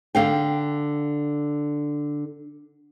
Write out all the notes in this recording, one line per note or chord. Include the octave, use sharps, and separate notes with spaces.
D3 F5 G5